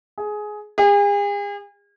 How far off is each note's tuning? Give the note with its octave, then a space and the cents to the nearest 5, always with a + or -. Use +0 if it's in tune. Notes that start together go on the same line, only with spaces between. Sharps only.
G#4 +15
G#4 -40